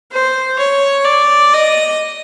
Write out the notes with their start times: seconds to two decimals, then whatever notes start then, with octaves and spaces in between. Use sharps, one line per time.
0.11 C5
0.58 C#5
1.05 D5
1.53 D#5